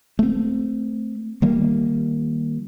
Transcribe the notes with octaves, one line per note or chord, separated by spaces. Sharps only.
A3 C4
D#3 G3 A#3